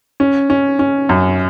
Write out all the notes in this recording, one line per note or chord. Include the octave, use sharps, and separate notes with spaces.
C#4
C#4
C#4
F#2